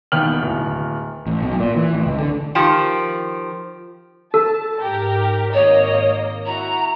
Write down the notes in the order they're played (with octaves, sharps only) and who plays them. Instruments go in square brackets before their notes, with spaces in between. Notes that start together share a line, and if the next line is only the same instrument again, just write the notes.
[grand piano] E1 D#2 B3 G5 F6 F#7
D1
[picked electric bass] A1
B1
A#2
E3
A1
C#2
D3
[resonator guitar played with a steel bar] D#3 F3 G4
[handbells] A4 [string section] A5
[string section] G#2 G4 A#4
[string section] G#1 A#3 D#5 [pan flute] C#5
[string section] E4 F#4 [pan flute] A#5